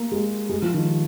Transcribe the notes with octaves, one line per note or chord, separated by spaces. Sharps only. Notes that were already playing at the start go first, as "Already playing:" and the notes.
Already playing: A#3
G#3
G#3
F3
D#3